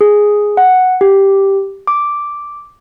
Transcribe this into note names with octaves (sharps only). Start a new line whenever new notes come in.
G#4
F#5
G4
D6